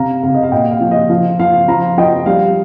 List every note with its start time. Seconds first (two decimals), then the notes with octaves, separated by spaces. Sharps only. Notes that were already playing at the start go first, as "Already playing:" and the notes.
Already playing: C3 F5 A#5
0.23 C3 F5
0.34 D#5
0.43 F5
0.51 A#2 D#5 G5
0.71 F5
0.80 F3
0.91 D#5
1.10 F3 F5
1.39 F3 F5
1.68 F3 F5 A#5
1.98 F3 D#5 G5
2.26 G3 F5